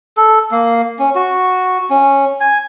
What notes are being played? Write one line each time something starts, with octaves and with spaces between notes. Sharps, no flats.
A4
A#3
C#4
F#4
C#4
G#5